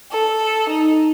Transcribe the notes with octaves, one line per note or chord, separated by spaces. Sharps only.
A4
D#4